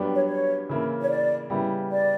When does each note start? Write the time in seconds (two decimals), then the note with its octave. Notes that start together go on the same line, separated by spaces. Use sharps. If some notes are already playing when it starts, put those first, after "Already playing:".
Already playing: G2 F#3 B3 D4 G4
0.15 C#5
0.28 C#5
0.69 C#3 E3 A#3 E4
1.02 C#5
1.09 D5
1.50 C#3 G3 B3 E4
1.91 D5